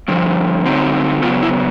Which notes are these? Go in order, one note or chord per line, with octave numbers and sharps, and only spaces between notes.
G2 D3 F3
D3 F#3 A3 C4 D#4
C#3 F#3 B3 F4
E4